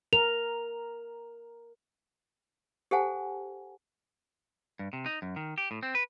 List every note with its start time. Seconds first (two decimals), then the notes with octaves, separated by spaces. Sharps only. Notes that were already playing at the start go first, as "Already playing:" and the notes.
0.13 A#4 F7
2.91 G4 A4 C5 F#5 G#5 A5
4.79 G2
4.93 C3
5.06 D#4
5.22 F#2
5.36 D#3
5.58 G4
5.71 A2
5.83 C4
5.95 B4